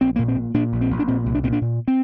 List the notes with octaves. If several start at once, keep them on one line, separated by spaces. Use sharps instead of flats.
A#1 C4
A#2 A#3
C4
A#2
A#2 D4
A#1
C4
A#1
D4
A#2 C4
C2
D4
A#2 C4
D4
A#2
C4